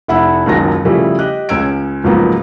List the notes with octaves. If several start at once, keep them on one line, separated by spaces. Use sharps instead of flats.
F1 E4 F#5 B5 E6
F#1 C#2 D#3 F#3 A#6
C#3 F3 G3 A3 E4 G#4
G4 D#5 F#6
C#2 C#4 E6 G#6 D7
C#2 G#2 F3 F#3 A#3 B3